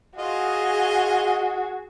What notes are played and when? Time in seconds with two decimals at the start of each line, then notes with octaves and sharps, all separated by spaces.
0.17 F4 F#4 G#4 D#5